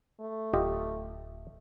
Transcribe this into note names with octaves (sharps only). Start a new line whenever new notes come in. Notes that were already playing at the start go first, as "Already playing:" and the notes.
A3
D1 F4 G4 D#5